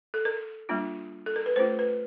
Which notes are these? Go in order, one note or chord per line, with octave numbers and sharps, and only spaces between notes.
A4
A#4
G3 A#3 D4 F4
A4
A#4
B4
A3 C#4 F4 C5
B4